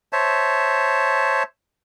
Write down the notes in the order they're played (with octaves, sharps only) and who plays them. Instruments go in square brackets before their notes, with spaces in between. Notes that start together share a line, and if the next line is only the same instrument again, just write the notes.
[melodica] C5 C#5 E5 A5